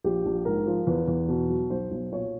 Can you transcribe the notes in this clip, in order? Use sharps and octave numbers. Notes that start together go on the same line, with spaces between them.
A#1 G4
A#1
G#2 A#4
F3
E2 B4
E2
B2
F#3
B1 C5
B1
A#2 C#5